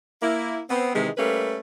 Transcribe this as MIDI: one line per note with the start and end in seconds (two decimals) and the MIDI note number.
0.22 0.59 58
0.22 0.59 64
0.69 0.94 59
0.69 0.94 60
0.94 1.09 48
0.94 1.09 51
0.94 1.09 52
0.94 1.09 56
1.17 1.57 55
1.17 1.57 57
1.17 1.57 58
1.17 1.57 61
1.17 1.57 71